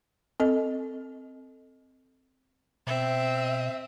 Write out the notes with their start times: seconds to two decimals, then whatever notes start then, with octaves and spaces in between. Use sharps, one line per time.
0.40 C4 A4 D#5
2.87 B2 C4 E5